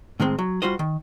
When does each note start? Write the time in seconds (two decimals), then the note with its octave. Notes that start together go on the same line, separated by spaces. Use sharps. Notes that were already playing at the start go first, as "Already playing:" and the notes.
0.20 A2 D#3 G#3 C4
0.39 F#3
0.62 G3 F4 F#4 C5 D#5
0.79 D#3